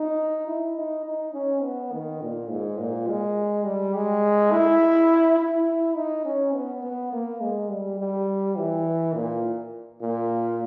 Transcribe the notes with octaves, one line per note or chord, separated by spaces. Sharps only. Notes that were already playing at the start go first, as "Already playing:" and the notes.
Already playing: D#4
E4
D#4
D#4
C#4
B3
D#3
A#2
G#2
A#2
G#3
G3
G#3
E4
E4
D#4
C#4
B3
B3
A#3
G#3
G3
G3
E3
A#2
A#2